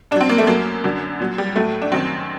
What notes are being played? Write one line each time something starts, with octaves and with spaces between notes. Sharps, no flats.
G2 F#3 C4 D4
A#3
A3
F#2 F#3 A#3
F#2 D3 F#3
A#2 F#3
G3
A2 F#3 A3
D4
F#2 D#3 F#3 C4